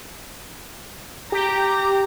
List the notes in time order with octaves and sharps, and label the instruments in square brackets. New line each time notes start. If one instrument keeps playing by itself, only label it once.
[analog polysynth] G4 [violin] A#5